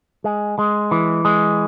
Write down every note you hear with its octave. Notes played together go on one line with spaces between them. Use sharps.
G#3
G#3
E3
G#3